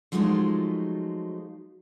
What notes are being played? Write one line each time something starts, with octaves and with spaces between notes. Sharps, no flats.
F3 F#3 G#3 A3 D#4 F4